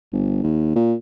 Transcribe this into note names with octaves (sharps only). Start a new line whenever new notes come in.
G1
D#2
A#2